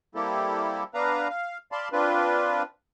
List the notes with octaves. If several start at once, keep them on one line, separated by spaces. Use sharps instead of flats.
G3 A#3 C4 E4 G4 A4
B3 D4 B4 F5 A#5
F5
D5 F5 A5 B5 C6
C4 D4 F4 B4